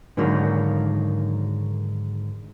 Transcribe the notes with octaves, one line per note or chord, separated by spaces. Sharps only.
G#2 D3 D#3 F#3 A#3